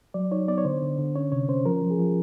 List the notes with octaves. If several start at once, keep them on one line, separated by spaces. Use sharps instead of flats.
F#3 D5
D#4 C#5
B3 D5
C#5
D3 C5
D3
D3
C#4 C#5
C3 C#5
C#4 C5
F3 A#4
F3
G#4
F3